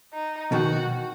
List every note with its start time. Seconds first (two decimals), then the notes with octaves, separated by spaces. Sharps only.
0.13 D#4
0.52 B2 D#3 F#4